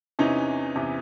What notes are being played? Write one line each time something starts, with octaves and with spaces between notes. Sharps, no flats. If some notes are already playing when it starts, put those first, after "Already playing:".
E2 C3 E3 C#4 D#4
E2 C3 E3